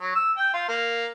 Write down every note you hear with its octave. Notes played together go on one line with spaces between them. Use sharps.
F#3
E6
G5
F4
A#3